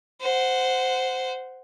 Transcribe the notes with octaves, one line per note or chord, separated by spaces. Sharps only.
C5 F#5